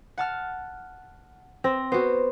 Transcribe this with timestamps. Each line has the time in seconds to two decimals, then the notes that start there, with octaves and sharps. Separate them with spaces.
0.18 F#5 A5 F6
1.64 C4 A#6
1.92 B3 F#4 C5